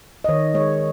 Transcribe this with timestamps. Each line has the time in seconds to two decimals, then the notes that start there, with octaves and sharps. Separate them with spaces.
0.24 D#5
0.29 D#3 C#5
0.54 G#3 C#5